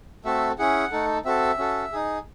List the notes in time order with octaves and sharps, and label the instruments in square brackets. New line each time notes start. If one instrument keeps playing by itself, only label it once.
[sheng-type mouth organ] A3 C4 F#4 A4 E5
C#4 E4 G#4 F#5
A3 D#4 A4
C4 F#4 A4 E5
C#4 F#4 A4
D#4 G#4